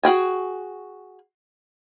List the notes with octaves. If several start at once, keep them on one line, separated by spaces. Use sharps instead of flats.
F#4 G#4 G5 G#5